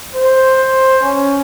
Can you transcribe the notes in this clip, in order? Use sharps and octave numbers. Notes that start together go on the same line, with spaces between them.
C5
C#4